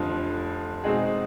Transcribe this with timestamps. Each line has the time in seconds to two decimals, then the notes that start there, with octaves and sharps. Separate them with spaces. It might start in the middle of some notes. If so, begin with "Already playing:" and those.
Already playing: F1 F2 D3 F3
0.84 B2 G#3 C4 D#4 G#4